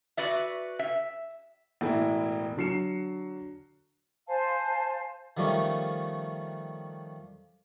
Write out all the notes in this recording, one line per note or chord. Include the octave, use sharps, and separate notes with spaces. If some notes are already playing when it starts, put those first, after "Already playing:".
F#4 B4 D5 E5
E5
E1 A2 E3 E4
D3 F#3 C7 C#7 E7
C5 F5 G#5 A5
D#3 F3 G3 A3 C#4